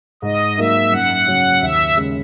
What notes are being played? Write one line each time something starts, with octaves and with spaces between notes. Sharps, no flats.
G#2 D#5
F#3 A#3 D#4 A#4 E5
F#2 F#5
C#3 F#3 C#4
D#2 E5
C#3 G#3